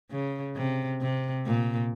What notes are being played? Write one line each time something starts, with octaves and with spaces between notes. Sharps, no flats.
C#3
C3
C3
A#2